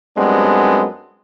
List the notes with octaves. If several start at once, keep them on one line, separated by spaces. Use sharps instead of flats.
F#2 G3 G#3 B3 C4 D4